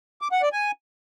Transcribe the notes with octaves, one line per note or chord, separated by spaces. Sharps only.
D6
F#5
D5
G#5